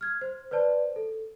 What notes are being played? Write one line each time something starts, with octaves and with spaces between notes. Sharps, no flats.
F6 G#6
C5
B4 C5 D5 A5
A4